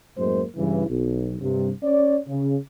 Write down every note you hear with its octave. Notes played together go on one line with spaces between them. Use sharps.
F#2 A2 G#3 A#3 C5
G2 C#3 E3
B1
G2 C3
C#4 C#5 D5
C#3